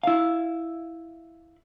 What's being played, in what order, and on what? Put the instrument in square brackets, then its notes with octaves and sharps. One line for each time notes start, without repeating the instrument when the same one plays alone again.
[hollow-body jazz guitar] E4 F5